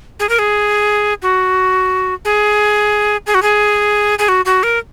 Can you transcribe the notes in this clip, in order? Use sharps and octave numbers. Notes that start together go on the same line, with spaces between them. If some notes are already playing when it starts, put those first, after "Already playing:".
G#4
A#4
G#4
F#4
G#4
G#4
F#4
G#4
G#4
F#4
F#4
A#4